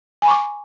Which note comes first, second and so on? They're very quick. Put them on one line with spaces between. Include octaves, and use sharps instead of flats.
G#5 B5 C#6 D6